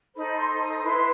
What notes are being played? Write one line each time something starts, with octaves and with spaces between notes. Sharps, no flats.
D#4 A4 C5 B5
C6
D#6
E4 B4 C6